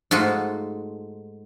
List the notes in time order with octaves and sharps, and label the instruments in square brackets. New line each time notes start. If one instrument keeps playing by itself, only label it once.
[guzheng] G#2 A3 F4 F#4